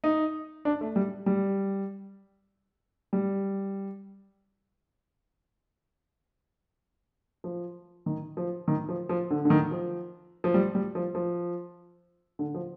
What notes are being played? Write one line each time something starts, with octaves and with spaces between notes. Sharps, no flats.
D#4
D4
A3
G3
G3
G3
F3
D#3
F3
D#3
F3
F3
D3
D3
D#3
F3
F3
G3
G3
F3
F3
D3
F3